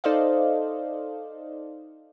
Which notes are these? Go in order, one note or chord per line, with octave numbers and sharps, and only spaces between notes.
D#4 A4 C5 D5 D#5 F5